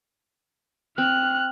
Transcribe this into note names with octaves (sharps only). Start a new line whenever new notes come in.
C4 F6 F#6